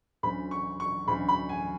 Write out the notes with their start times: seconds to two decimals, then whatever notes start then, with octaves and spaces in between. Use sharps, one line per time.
0.23 D2 D3 F#3 C#4 B5
0.51 C#6
0.80 C#6
1.08 D2 D3 F#3 C#4 B5
1.29 B5
1.49 G#5